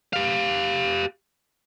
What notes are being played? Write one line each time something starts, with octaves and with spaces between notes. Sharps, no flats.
G4 F5